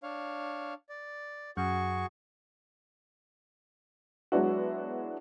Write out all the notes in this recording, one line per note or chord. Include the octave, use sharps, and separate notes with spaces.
D4 C#5 F5
D5
F#2 F#4 G#4 C#6
F#3 G#3 B3 D4 E4 F#4